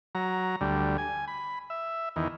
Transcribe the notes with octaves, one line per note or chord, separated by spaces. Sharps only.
F#3 A#5
D2 G3
G#5
B5
E5
E2 D#3